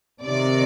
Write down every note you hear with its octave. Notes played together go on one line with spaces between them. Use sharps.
C3 D#3 D5